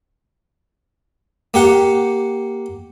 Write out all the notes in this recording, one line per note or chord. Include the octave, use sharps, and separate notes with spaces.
A#3 G4 F#5